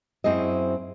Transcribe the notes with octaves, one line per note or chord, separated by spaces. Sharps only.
F#2 C4 E4 G#4 D#5